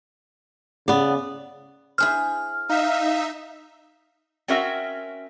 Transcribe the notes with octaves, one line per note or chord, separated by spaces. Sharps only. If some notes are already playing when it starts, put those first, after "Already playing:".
C#3 B3 D5
E4 G#4 C5 F6
D#4 E5 F5
C4 C#4 F#4 A#4 E5